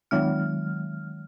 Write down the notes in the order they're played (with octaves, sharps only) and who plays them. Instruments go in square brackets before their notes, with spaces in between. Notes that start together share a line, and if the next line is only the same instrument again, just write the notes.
[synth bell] D#3 F#3 G#3 F6